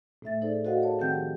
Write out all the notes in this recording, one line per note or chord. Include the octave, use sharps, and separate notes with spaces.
A2 A3 E5 A6
D#4 G#4 A4 C5 D5
F#4 A4 C5 D#5 F5 F#5
G#4 A#4 C#5 A5
D#3 F3 C4 F#5 G5 G6
G4